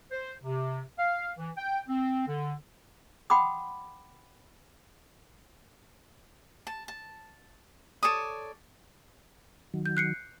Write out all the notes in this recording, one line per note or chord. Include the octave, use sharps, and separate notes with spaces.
C5
C3
F5
E3
G5
C4
D3
F#5 G5 B5 C6 D6 D#6
A5
A5
A4 C#5 D5 D#6
D#3 F#3
G6
F#6 C7 C#7